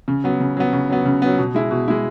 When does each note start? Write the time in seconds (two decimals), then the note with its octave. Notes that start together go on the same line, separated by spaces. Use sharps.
0.08 C#3
0.24 F#3 B3
0.40 C#3
0.57 F#3 B3
0.73 C#3
0.90 F#3 B3
1.05 C#3
1.22 F#3 B3
1.38 B2
1.55 G#3 E4
1.71 B2
1.88 G#3 E4